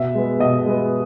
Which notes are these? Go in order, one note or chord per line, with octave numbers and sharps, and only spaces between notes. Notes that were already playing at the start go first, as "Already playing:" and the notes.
Already playing: B2 E5
G#3 B3
B2 D#5
G#3 B3